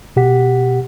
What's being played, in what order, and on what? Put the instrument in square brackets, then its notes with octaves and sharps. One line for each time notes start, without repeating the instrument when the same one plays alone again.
[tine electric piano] B2 G4 F#5 B6